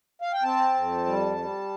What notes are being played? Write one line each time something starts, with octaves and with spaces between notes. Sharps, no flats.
F5
G5
C4 A5
F2
G3
G3